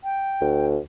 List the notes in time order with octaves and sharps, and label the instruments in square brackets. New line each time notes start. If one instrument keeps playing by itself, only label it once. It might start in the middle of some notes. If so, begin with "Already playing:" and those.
[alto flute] G5
[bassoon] D2